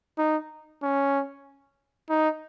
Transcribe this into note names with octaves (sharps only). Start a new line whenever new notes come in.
D#4
C#4
D#4